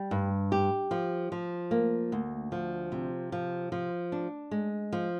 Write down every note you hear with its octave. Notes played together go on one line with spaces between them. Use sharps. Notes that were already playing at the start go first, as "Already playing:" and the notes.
Already playing: G3
G2
G4
F3
F3
A#3
D2
F3
C3
F3
F3
D4
G#3
F3